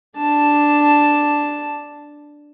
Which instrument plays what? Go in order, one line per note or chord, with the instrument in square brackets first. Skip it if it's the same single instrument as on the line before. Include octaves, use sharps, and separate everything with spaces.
[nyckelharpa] D4 A5